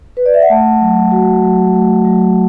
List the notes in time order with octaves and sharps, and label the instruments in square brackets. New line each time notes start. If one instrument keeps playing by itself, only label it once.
[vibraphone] B4
D5
E5
F#5
A3 A5
F#3
F#4
F#3
A3
F#3